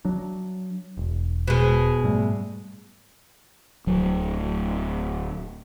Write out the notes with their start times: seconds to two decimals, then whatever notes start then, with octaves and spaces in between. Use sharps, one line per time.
0.05 F#3 D4
0.97 E1
1.47 B2 G#3
2.04 G#2 G3 A3
3.87 D1 F#3